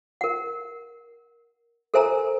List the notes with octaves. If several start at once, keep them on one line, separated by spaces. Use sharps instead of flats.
A#4 F#5
A4 A#4 C5 E5 G#5 A#5